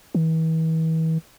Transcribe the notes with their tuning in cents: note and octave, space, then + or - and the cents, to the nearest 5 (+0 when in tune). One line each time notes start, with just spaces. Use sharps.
E3 -40